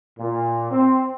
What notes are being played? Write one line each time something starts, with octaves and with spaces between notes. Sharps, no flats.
A#2
C4